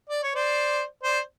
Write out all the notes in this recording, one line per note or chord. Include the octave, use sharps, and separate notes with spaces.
D5
C#5
C5 D5
C5 D5